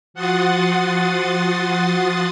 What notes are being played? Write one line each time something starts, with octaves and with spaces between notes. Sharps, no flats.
F3 F#4 F#5 C6 D#6 A6